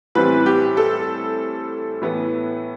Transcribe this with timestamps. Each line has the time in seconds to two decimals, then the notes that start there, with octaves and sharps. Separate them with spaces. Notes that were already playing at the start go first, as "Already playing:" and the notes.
0.15 A2 E3 G3 C4 B4
0.46 G4
0.77 A4
2.01 A2 E3 B3